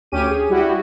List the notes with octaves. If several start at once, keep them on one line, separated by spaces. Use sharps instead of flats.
D2 C#4 G4 D#7
G#4
G3 E4 F#4 G4